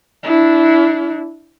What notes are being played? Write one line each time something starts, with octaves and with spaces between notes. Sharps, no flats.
D4 E4